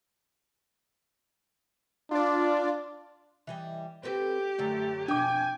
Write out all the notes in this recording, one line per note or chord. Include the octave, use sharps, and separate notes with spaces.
D4 F4 D5
E3 G3 D#5
C4 G4 A4 B4
F#2 D3 F#3 A3 A4
F2 B2 D4 G5 G#5 D6